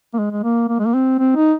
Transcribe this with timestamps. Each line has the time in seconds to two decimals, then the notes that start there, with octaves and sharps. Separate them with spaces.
0.14 A#3
0.19 G#3
0.32 G#3
0.43 A#3
0.68 A#3
0.79 G#3
0.86 A#3
0.94 C4
1.19 C4
1.36 D#4